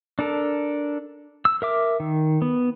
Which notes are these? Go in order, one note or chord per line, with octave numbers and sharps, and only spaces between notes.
D4 A4 A#4
E6
A#4 E5 D6
D#3
B3